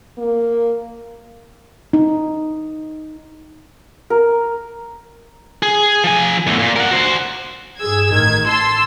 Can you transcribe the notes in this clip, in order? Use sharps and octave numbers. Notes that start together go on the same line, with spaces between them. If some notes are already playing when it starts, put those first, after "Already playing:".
A#3
D#4
A#4
G#4
F3 G#5
E2 A3
A#2
A#4 F#5
F#4 C5
G2 G#4 E6 G#6
A1 D#3 G#6
A5 C6 E6